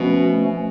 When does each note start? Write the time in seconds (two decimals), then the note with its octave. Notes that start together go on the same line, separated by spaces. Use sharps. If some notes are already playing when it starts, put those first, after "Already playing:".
Already playing: B2 F3 A3 C#4